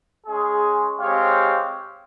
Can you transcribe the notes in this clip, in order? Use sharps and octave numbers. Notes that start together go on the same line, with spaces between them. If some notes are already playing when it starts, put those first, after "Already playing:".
G#3 C#4 G#4
G#3 C4 G4 C#5 F5